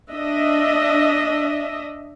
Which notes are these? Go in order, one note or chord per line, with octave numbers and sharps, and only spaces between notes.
D4 D#5 E5